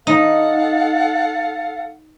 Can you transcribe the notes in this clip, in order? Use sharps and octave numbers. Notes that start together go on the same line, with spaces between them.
D#4 A4 F5 F#5